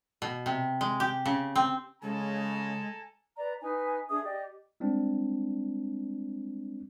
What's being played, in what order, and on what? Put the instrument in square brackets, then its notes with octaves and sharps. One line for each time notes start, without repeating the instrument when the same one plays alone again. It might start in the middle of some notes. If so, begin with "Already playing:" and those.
[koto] B2
C3
G#3
G4
C#3
C4
[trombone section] C#3 [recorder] G#3 [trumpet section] A4 G#5 A#5
[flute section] B4 D5 A#5
D#4 B4 G#5
D4 G#4 E5 D#6
G4 D5 D#5
[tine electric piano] G3 G#3 C4 D4